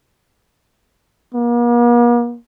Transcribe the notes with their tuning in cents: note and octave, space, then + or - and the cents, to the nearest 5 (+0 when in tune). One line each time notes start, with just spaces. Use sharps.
A#3 +45